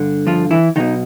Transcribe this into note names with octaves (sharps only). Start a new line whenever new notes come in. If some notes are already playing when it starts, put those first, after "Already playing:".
Already playing: G2 D3
F3 F4
E3 E4
B1 B2 D#3 D#4